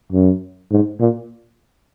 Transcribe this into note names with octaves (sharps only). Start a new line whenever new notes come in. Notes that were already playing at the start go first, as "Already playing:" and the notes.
F#2
G#2
A#2